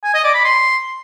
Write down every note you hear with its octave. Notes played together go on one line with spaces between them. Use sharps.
G#5
D#5
D5
B5
C6